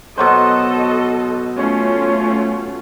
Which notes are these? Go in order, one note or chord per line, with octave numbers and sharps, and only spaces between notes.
B2 F#3 A4 C5 D#5
A3 C#4 F4